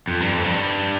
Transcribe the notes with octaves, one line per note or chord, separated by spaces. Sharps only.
F2
G2
F2
G2